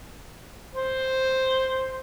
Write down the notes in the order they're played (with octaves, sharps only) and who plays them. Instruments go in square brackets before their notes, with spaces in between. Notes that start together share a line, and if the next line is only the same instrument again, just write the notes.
[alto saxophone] C5